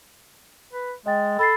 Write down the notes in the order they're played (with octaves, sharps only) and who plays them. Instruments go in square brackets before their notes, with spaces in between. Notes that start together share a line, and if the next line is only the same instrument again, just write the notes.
[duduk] B4
[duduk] G#3 [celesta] D#5 G5 A6
[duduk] A4 [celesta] B5 A6 C7